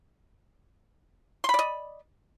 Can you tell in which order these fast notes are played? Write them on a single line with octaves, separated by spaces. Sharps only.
C6 B5 D5 D#5